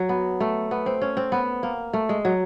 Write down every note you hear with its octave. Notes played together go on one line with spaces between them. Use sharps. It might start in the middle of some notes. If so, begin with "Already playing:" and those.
Already playing: F#3
B3
A3
B3
C4
C#4
C4
B3
A#3
A3
G#3
F#3